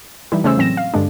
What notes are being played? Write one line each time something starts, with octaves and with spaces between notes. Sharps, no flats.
E3 G3 D#4 E4
C#3 A3 C#4 C5 E6
A2 E3 F#3 C4 A#6 E7
F5
G2 D3 G#3 D4